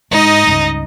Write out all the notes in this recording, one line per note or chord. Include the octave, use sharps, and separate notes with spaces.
G#2 D#4 D#5
C#2 G2